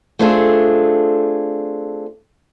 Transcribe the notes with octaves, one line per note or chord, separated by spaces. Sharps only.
A3 C4 D4 F4 G#4 A4